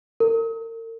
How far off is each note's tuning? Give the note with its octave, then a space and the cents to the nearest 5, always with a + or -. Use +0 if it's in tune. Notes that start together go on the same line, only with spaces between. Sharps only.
A#4 -40